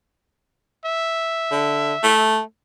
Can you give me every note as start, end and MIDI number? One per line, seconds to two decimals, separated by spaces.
0.85 2.22 76
1.52 1.94 50
2.04 2.40 57